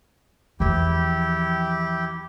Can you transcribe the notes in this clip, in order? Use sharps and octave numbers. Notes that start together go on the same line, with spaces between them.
E2 F3 E4 G4 G5